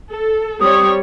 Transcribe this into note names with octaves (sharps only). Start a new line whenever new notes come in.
A4
G3 C4 C#5 D#6